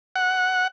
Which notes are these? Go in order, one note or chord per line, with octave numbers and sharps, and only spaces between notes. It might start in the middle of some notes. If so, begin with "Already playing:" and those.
F#5